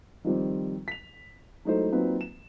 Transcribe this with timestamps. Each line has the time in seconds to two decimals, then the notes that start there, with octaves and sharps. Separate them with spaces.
0.25 D#3 F3 G3 C4
0.88 B6 F7
1.65 F#3 G#3 A3 D#4 E4 C5
1.92 F#3 A#3 C4 D#4 F4 B4
2.21 E7